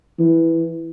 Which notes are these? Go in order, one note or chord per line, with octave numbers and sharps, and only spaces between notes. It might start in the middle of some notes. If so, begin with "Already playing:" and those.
E3